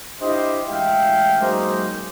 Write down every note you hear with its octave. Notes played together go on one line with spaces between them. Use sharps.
D4 E4 F4 G4 C5 D#5
A1 G#3 E5 F5 G5
F#3 G#3 A#3 C#4 D#4 C5